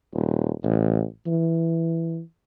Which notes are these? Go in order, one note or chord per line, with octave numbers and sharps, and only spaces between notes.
D#1
A1
E3